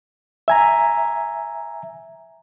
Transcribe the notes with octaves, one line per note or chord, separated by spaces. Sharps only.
E5 G#5 A#5